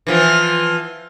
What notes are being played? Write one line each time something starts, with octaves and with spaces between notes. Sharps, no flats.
E3 F3 B3